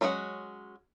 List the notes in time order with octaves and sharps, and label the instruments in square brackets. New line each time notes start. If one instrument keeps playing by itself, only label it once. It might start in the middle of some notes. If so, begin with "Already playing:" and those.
[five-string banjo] F#3 G#3 C#4 F4 F#5